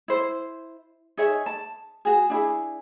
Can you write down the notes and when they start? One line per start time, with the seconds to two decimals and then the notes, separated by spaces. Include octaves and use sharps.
0.08 E4 C5
1.17 D#4 G#4 C#5 E5
1.46 A5
2.05 F#4 G#4
2.30 D4 E4 G#4